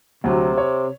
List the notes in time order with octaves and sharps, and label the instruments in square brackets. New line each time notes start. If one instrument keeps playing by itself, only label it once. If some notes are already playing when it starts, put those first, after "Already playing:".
[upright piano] D2 F#3 [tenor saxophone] C3
[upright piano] C#5